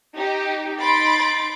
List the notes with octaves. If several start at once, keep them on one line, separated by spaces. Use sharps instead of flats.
D#4 G4
D#4 B5 C6 A6 D7